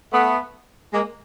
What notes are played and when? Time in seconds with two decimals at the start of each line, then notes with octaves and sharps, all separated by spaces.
0.12 A3 B3
0.93 G#3 A#3